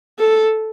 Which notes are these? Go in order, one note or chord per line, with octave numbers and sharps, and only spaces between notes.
A4